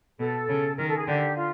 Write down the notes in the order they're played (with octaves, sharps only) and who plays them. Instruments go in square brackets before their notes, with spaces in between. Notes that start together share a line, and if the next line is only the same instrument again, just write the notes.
[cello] B2 [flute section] A4
[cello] C#3
[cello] D#3 [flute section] A#4
[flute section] A4
G#4
[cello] D3 [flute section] G4
[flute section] F4